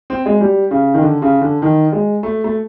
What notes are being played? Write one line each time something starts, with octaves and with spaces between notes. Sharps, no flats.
C4
G#3
G3
C#3
D#3
D3
C#3
D3
D#3
G#3
A3
A3